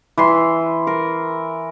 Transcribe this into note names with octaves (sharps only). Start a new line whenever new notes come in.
E3 B5 C6
A#4